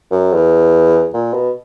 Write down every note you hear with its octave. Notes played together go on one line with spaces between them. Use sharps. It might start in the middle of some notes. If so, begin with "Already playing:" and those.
F#2
E2
A#2
B2